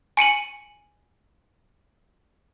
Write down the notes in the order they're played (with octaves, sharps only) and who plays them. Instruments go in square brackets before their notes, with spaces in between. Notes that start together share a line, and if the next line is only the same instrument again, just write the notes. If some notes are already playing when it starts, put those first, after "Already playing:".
[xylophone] G#5 C#7 D#7 F#7